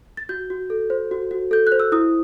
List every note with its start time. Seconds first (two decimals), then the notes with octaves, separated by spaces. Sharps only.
0.17 A6
0.29 F#4 G6
0.50 F#4
0.70 A4
0.90 C5
1.11 F#4
1.31 F#4
1.51 A4 G6
1.67 F#6
1.72 C5
1.80 E6
1.92 E4 D#6